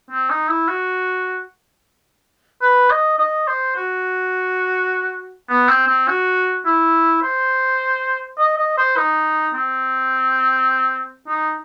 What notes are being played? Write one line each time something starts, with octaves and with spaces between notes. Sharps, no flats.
C4
D#4
E4
F#4
B4
D#5
D#5
C5
F#4
B3
C4
C4
F#4
E4
C5
D#5
D#5
C5
D#4
C4
D#4